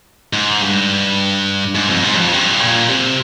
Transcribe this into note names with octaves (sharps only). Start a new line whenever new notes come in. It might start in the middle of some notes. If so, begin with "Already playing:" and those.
G#2
G2
G#2
F2
G#2
G2
F2
G2
A#2
C3